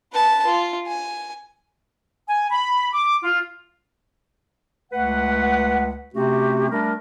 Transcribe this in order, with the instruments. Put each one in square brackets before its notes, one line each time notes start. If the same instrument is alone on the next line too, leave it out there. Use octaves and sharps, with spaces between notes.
[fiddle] B4 A5
F4
G#5
[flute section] G#5
B5
D6
F4
[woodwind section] C#2 A3 B4 F#5
C3 A3 C4 C#4 F#4 G4
G3 A3 D4 A#4